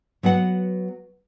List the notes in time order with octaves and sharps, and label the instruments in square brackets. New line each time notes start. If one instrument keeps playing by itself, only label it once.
[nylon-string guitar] F#3 B3 F#4 F#5